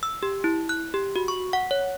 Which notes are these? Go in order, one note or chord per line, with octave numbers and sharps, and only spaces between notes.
E6
G4
E4
F#6
G4
F#4
C#6
F#5
C#5